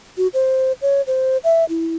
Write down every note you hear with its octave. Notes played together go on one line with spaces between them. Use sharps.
F#4
C5
C#5
C5
E5
E4